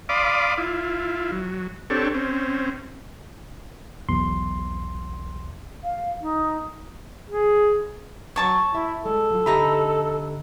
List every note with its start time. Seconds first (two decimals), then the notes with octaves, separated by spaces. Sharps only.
0.09 D5 F5 B5 C6 D6 D#6
0.58 E4 F4
1.32 F#3
1.90 C4 D4 G4 A4 C#5
2.14 C4 C#4
4.09 B1 E2 C6
5.83 F5
6.21 D#4
7.30 G#4
8.36 F#3 C#5 A5 C#6
8.75 E4 E5
9.05 G#3 A4
9.31 F#3 F4
9.46 D3 D#4 G4 E5 A#5 B5